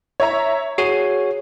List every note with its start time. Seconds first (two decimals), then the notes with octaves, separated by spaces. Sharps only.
0.20 C#5 E5 A#5
0.78 F#4 G#4 C#5 C7 D#7